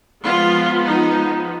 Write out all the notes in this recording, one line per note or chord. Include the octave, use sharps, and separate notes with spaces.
F3 G#3 B3 F4
D#4